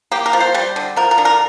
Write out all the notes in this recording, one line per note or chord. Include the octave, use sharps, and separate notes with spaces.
A#3 G4
A#4
F3
C5
G3 C5
D3
F3 A#4
A#4
D3
A#4